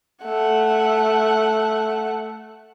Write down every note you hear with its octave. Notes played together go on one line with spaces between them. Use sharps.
A3 F#5